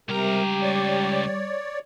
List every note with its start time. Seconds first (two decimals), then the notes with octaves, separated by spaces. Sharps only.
0.09 C#2 C3 G3 G4 A#4 A#5
0.62 C#5 D5